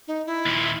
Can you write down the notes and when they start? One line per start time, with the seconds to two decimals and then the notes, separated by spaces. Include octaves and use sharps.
0.08 D#4
0.26 E4
0.46 D#2 A#2